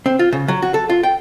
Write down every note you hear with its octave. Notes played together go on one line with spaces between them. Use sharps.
C4
F4
C#3
F#3
F#4
A4
F4
G5